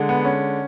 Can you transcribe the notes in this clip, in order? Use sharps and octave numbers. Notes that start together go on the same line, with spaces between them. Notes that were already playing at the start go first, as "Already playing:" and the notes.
Already playing: D3 G#3
B3
C#4